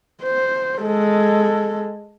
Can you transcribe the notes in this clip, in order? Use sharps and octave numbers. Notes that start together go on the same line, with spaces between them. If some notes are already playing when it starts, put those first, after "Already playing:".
C5
G#3 A4